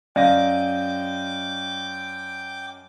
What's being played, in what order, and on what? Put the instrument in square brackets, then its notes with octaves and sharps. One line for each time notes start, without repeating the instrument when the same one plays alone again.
[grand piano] F#2 D#5 A#6 [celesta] D5 F5 [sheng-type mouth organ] G5 D6